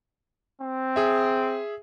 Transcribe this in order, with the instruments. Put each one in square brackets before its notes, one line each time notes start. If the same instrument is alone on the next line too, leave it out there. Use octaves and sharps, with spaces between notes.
[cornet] C4
[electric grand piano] G#4 E5